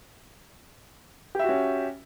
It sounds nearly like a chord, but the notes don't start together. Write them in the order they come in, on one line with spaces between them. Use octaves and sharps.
G4 E5 F#4 C#4